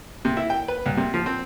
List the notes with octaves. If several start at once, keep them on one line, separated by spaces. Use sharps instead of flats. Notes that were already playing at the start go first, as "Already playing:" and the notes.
C3
E4
G5
B4
C2
C3
F3
C4